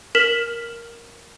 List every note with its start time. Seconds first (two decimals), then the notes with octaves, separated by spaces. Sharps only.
0.15 A#4 F6 B6 E7 F#7